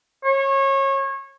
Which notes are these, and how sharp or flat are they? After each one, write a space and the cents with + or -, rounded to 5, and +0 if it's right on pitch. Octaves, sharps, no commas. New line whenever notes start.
C#5 -25